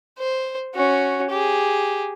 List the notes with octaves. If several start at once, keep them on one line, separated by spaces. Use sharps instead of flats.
C5
C#4 F#4
G4 G#4